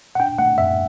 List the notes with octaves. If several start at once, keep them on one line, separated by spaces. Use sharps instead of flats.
F#5
D4 G5
A3 F#5
F#2 E5